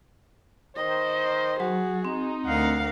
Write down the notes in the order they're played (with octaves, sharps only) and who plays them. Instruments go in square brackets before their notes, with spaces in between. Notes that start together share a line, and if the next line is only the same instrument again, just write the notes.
[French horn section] D#3 C5 [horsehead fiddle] D#5
[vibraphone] F#3 [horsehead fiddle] F#4 G#4
[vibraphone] C4 [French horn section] D#4
[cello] D2 F5 [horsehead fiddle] A#4 F#5